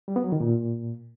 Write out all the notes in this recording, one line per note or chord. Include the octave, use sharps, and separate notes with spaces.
G3
B3
F#3
D#3
A#2